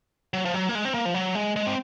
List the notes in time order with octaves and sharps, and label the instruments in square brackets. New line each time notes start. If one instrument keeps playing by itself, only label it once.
[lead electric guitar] F#3
F3
F#3
A#3
G#3
C4
A#3
F3
F#3
G#3
G#3
C4